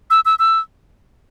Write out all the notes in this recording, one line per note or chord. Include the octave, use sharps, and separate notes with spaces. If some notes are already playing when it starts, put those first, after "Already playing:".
E6
E6
E6